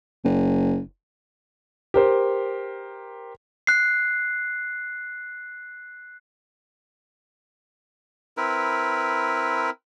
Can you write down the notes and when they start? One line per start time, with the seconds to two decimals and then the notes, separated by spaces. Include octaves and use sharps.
0.25 F#1
1.94 G4 A#4 C5
3.67 F#6 C7
8.37 C4 E4 A#4 B4